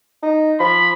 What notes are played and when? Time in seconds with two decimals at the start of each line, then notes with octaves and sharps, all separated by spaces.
0.23 D#4
0.60 F3 B5